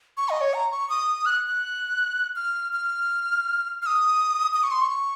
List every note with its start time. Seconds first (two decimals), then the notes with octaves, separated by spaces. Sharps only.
0.17 C#6
0.29 D#5
0.41 C#5
0.54 A#5
0.72 C#6
0.90 D#6
1.26 F#6
1.48 F#6
2.36 F6
2.73 F6
3.82 F6
3.86 D#6
4.54 D#6
4.63 C#6
4.71 C6
4.81 C#6